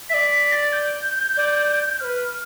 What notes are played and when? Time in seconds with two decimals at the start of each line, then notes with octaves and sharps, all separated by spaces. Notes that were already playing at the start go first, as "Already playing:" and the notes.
0.10 E5 B6
0.14 D5
0.31 B6
0.52 A6
0.73 G6
1.37 D5
2.00 C5 F6
2.04 B4